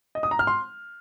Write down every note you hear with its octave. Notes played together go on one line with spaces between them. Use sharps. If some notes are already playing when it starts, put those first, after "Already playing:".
D#5
D#6
A#5
F6
C6